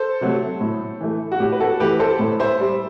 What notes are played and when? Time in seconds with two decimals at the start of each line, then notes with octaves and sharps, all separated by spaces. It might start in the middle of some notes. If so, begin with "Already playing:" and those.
Already playing: A4 C5
0.21 C3 F#3 A3
0.61 A2
1.01 E3 A3
1.32 F#4
1.40 A2 G4
1.52 B4
1.60 F#4 A4
1.80 E3 A3 G4 B4
2.00 A4 C5
2.19 A2
2.39 C5 E5
2.60 G3